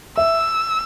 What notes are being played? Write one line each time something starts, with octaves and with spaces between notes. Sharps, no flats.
E5 E6